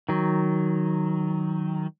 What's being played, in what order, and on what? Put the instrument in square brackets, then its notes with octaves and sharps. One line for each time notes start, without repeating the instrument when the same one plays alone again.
[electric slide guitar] D#3 F#3